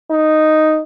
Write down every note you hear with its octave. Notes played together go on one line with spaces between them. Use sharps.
D#4